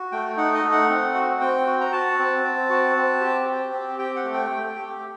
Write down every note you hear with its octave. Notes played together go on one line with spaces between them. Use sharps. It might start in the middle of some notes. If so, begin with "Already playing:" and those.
Already playing: F#4
A3 G5
D#4 F#5
D#5
A3
F#5
C4
F#4
C4 G5
F#4
A#5
F#4 A5
C4
C4
F#4
C4
G4
G4
C4
G4 G5
F#5
A3
G5
A3
G4